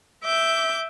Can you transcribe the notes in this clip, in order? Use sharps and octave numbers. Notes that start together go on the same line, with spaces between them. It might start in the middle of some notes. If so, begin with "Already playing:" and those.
E5 D6 G6